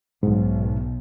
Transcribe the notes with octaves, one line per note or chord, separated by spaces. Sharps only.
B1 G#2